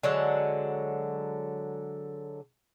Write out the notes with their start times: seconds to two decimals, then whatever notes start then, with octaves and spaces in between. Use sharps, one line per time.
0.03 D3 F#3 G#3 F#5